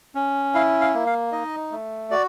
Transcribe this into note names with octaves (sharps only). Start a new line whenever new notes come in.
C#4
E4 F5
F5
A#3
F5
D#4 D#5
A3
F#4 D5